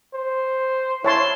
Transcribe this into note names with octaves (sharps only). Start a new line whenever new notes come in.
C5
E4 C#5 A5 C6